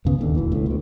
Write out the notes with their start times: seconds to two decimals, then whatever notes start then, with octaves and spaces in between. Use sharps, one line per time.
0.05 F#2 C#3 B3
0.19 D1 D#2 D3
0.36 E1 D2 E3
0.52 C#2 A2
0.66 D2 B2